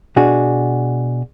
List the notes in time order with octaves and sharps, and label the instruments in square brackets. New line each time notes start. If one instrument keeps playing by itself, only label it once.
[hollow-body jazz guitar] B2 D4 F#4 G#4